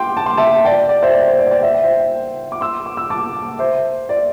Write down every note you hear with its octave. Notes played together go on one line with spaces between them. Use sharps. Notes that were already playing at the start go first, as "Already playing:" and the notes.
Already playing: G5 C6 D6
A5
C6
E5 A5
D5 G5
D5
C5 E5
D5
C5
D5
D5 G5
E5
G5
C5 E5
D6
C6 E6
D6
E6
A5 D6
C5 E5
D5